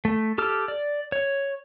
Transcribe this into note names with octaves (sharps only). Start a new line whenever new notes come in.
A3
G4 A4 D6 F6
D5
C#5